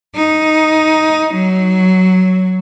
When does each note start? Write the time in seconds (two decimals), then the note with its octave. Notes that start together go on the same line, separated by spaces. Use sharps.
0.14 D#4
1.35 F#3